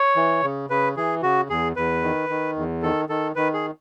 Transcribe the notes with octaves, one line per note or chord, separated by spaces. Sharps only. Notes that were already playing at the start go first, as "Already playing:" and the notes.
Already playing: C#5
E3
C#3
C#3 B4
E3 G#4
C#3 F#4
E2 G#4
E2 B4
D#3
D#3
E2
D#3 A4
D#3 A4
D#3 B4
G#4